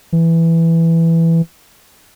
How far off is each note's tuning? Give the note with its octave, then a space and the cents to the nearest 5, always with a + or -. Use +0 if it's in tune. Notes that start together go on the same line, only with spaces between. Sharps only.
E3 +5